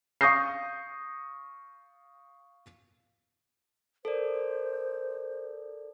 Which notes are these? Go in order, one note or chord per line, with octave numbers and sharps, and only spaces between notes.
F5 C#6 D#6 G6 A#6 C7
A4 A#4 C5 D5